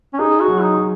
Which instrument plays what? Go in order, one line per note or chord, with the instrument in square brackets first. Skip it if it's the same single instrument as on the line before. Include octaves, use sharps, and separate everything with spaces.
[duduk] C#4
[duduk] D#4 [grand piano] G#4
[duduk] F#4
[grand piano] F#3
[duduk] D#4
[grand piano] F#3